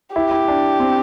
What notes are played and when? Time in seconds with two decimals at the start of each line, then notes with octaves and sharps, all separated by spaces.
0.15 E4 G4
0.31 E4
0.48 D4
0.80 C4